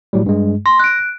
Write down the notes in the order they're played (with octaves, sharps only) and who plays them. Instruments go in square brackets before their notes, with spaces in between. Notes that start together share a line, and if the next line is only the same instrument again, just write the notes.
[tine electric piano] A2 F#3 G3
G2 G#3
[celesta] C6 [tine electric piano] A#6
[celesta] F#6 D7